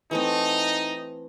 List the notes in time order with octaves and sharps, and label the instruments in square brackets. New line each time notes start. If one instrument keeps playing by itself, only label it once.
[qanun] E3 A3 C4 [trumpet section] D#4